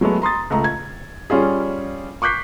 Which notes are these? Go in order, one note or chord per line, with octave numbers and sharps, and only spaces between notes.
F#3 G#3 A3 B3
A#5 C6 D#6 A6
C#2 A3 A#5
G#6
G3 C#4 F4 G#4
C#6 D6 F#6 G6 B6 C7